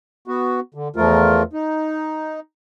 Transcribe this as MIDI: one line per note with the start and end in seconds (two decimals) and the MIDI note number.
0.28 0.60 59
0.28 0.60 66
0.74 0.88 50
0.96 1.43 40
0.96 1.43 53
0.96 1.43 57
0.96 1.43 65
0.96 1.43 70
1.53 2.40 63